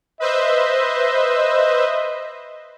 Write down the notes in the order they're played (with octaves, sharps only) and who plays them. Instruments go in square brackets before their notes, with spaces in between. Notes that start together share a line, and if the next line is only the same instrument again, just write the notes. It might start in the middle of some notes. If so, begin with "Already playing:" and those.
[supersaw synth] B4 C5 E5 [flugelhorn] D#5